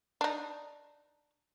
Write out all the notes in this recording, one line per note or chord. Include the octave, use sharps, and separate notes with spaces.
D4 D#4